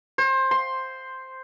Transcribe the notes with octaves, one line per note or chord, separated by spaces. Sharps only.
C5
C6